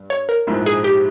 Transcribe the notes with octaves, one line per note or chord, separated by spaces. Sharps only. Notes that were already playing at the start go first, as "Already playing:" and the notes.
Already playing: G2
C#5
A#4
A#1 G#2 F3 G#3 E4
G#4
G4